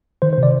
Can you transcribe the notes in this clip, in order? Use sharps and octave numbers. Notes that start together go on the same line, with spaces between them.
D#3 C5
C5
C3
D5